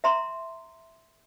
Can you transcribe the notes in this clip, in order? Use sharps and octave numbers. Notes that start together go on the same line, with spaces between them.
E5 A#5 C6